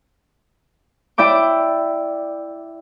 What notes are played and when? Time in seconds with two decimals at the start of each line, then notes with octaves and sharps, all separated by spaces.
1.18 E4 D5 G5 D6